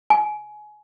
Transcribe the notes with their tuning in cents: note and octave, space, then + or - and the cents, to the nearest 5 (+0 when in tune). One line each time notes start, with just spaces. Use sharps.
G#5 +25